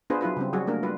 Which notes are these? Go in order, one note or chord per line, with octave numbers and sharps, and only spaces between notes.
B3 D4 F4 G#4 B4 C5
F#3 E4 F4 B4
C#3 G3 C4
F#3 G3 F#4 G#4
A3 A#3 D4 A#4
G3 F4 B4